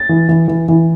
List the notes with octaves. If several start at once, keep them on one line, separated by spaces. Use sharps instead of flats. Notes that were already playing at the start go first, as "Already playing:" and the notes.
Already playing: A6
E3
E3
E3
E3